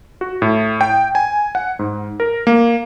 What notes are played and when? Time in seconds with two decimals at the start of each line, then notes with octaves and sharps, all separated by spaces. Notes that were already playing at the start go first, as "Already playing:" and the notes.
0.21 F#4
0.42 A2
0.81 G5
1.15 G#5
1.55 F#5
1.79 G#2
2.20 A#4
2.47 A#3